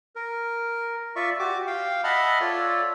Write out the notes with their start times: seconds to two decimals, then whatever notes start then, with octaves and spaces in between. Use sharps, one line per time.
0.16 A#4
1.16 F4 D5 E5 C#6
1.39 F#4 G4 D6
1.67 F5 G5
2.04 D#5 E5 F#5 A5 B5 F6
2.41 F4 A4 C#5 D5